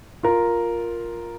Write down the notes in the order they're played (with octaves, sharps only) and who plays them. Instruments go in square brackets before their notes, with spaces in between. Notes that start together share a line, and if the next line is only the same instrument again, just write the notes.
[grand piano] F4 A#4